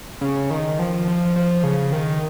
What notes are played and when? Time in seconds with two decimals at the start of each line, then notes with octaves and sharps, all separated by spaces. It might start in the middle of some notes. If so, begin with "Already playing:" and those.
0.21 C#3
0.50 D#3
0.79 F3
1.08 F3
1.36 F3
1.64 C#3
1.93 D#3